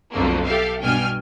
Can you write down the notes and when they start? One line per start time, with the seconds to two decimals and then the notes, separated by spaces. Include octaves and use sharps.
0.12 B1 F2 D3 A3 A#3
0.44 G4 A4 E5 F5
0.82 G2 B2 D4 G5 G#5 F6